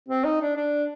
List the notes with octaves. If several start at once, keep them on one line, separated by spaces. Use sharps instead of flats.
C4
D#4
D4
D4